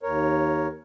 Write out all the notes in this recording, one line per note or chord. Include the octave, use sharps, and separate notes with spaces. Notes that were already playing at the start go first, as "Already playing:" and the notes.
D#2 A#4 C#5